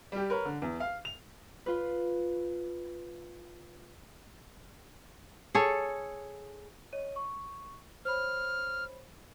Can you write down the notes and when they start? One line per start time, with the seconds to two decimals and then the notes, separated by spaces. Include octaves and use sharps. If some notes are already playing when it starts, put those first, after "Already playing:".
0.12 G3 G4
0.30 A#4 B4 C#5
0.45 D3
0.62 E2
0.80 F5
1.05 F7
1.66 F4 B4
5.55 G#4 A4 C#5
6.93 C#5 D#5 D#7
7.16 C#6
8.05 C5 C#5 B5 F6